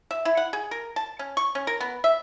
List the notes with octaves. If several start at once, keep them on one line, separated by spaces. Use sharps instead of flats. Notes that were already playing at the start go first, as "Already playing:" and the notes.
E5
E4
F#5
G#4
A#4
A5
C#4
C#6
C#4
A#4
B3
E5